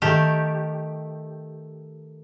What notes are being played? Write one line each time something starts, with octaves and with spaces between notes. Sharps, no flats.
D#3 A3 G4